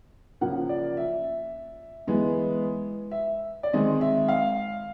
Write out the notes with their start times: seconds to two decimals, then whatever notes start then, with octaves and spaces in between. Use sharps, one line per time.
0.41 C#3 F3 A#3 F#5
0.69 D5
0.97 E5
2.07 E3 G#3 B3
3.11 E5
3.63 D5
3.73 D#3 G#3 C4 D#5
4.01 E5
4.28 F5